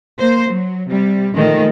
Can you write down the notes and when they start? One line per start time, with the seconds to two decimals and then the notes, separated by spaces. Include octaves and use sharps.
0.19 A#3 C5
0.49 F#3
0.90 C3 G3
1.35 A#2 D#3 F3 G#3 A3 A4